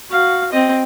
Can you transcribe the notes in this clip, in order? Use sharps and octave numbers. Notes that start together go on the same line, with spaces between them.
F#4 F5
C4 D#5